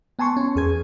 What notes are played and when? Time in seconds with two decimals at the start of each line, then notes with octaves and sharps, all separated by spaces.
0.19 B3 G#5 A5 C6 C#6
0.37 C#4
0.56 E2 G#4 G#6